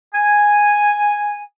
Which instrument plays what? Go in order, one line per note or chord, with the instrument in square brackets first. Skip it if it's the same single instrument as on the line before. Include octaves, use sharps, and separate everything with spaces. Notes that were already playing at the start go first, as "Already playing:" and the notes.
[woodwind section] G#5